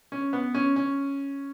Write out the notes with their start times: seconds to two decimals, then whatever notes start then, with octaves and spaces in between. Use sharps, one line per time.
0.12 C#4
0.33 B3
0.54 C#4
0.76 C#4